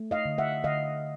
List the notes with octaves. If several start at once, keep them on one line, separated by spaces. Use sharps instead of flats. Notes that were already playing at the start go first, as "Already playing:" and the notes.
Already playing: A3
D#5 F5
D3
E5 F#5
D3 D#5 F5